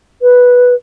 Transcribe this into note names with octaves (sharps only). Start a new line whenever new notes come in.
B4